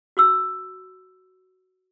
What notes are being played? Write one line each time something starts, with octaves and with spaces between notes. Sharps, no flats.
F#4 C6 E6